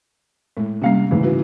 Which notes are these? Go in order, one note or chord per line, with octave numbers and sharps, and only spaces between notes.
A2 G#3
C3 G3 A#3 C#4 F5 C7
G#2 C#3 E3 A3
E4 F#4 B4